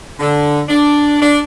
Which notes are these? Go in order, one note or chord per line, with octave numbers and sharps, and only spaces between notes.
D3
D4
D4